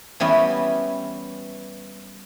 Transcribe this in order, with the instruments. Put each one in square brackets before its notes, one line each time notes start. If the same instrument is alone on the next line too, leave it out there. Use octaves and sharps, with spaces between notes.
[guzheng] E3 G3 B3 C#4 E4